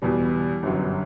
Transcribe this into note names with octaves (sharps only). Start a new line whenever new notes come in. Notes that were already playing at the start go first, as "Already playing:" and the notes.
E2 B2 G3
G1 F#2 F#3